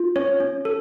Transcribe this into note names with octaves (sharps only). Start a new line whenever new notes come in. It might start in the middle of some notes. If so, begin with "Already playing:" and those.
Already playing: F4
C#4 C#5
C#4
A4